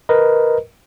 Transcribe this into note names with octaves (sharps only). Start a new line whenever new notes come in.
A#4 B4 D#5